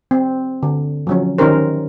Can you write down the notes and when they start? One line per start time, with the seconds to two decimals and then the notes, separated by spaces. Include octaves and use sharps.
0.11 C4
0.63 D3
1.07 F3 F#3 C#4
1.38 D#3 C#4 D#4 G4 A#4 C5